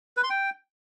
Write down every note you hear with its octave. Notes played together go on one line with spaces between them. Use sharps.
B4
C6
G5